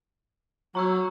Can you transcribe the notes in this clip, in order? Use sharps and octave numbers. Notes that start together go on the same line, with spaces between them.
F#3 F#4 C#5 A#5 C#6 E6